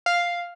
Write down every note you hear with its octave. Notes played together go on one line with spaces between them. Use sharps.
F5